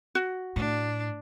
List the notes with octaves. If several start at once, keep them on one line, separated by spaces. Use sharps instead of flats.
F#4
A2 D4